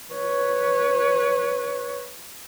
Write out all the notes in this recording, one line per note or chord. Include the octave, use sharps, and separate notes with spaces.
B4 C#5